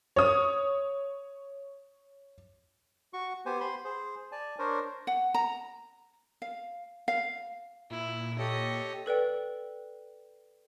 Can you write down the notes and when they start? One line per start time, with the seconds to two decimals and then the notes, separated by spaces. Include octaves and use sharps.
0.16 C#5 D#6
3.13 F#4 C#6
3.46 B3 G4 C5 G#5
3.60 C5 B5 C6
3.85 G#4 C5
4.32 D5 G#5 A5
4.59 D4 A#4 C5 C#5
5.07 F#5
5.34 A#5
6.42 F5
7.08 F5
7.91 A#2 E4
8.39 G4 A4 C#5 D#5
9.06 A4 B4 D5 G5